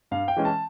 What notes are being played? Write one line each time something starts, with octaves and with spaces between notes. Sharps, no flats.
G2 F5
G5
E3 G#3 C#4
A5